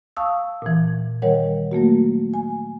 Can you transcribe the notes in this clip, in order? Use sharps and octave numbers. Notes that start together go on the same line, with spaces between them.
F5 A5 C#6 D#6 E6
A#2 E3
D#3 G3 A#4 C#5 F#5
F#3 A3 A#3 F#4
G#5